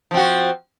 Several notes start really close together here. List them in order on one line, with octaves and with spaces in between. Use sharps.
F3 C4 F#4